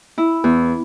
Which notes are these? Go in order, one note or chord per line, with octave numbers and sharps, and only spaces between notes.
E4
E2